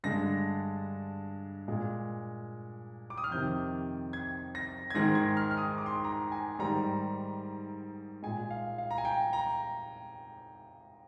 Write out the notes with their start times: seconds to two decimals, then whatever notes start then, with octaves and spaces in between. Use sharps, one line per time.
0.04 G2 D3 G#3 A#6
1.68 A#2 G#3
3.10 D6
3.18 D#6
3.24 F6
3.31 F2 C3 D#3 G6
4.13 G#6
4.55 A#6
4.90 G#6
4.95 G#2 D#3 G#3 A#6
5.15 G#6
5.37 F6
5.51 F6
5.57 D#6
5.78 D6
5.86 C6
5.95 D6
6.04 A#5
6.32 G#5
6.59 G#2 D#3 G3 A#5
8.23 A#2 G#3 G#5
8.50 F5
8.78 F5
8.91 A#5
8.98 G#5
9.05 G5
9.33 A#5